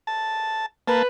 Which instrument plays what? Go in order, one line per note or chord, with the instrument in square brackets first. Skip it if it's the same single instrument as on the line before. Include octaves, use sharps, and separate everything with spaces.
[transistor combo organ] A5
[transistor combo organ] A#3 A5 [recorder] B4